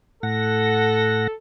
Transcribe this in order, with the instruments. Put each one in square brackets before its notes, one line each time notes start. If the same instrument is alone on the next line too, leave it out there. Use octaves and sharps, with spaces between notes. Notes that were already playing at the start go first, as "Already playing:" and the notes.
[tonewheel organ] A2 F#5 A#6 [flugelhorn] A4